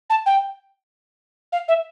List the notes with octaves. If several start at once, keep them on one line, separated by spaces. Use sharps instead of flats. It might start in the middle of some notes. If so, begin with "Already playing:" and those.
A5
G5
F5
E5